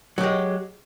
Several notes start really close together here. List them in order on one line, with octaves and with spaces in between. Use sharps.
F#3 G4 G#3